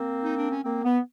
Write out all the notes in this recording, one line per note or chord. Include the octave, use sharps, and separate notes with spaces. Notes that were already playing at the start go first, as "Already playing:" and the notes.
Already playing: A#3 C4
D#4
D4
C#4
A#3 C4
B3